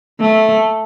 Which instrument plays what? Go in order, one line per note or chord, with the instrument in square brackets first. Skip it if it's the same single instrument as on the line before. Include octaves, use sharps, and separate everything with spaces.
[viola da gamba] A3